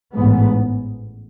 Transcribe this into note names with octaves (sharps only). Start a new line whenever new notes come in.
A1 G#2 B3